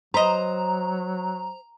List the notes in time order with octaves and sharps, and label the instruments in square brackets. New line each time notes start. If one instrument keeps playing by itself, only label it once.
[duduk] F#3 [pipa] B4 D#5 [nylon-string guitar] C5 [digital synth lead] A#5